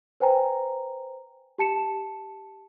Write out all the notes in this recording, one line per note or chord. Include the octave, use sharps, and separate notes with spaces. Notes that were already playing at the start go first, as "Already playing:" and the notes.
B4 C5 G5 G#5 A#5
G4 A5 C#7 E7